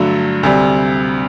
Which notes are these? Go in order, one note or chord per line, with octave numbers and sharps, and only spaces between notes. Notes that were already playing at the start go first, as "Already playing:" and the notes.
Already playing: G2 D3 F#3 A3
D2 C3 G3